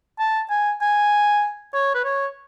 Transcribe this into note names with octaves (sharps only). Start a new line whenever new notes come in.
A5
G#5
G#5
C#5
B4
C#5